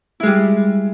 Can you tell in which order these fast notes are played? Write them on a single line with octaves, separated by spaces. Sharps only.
E4 G#3 G3